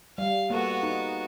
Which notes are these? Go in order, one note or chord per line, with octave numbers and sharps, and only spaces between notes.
G3 F5
A#3 B3 F#4 A4
D#4